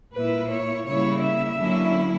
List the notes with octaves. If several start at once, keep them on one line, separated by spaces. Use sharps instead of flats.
A#2 A#3 E4 B4
C#5
C#3 G3 A#3 E4 C#5
E5
D3 F#3 A#3 C#4 E4